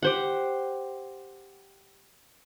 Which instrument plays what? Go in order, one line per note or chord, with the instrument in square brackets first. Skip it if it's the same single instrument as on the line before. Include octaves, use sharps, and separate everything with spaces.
[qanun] G4 C5 F#5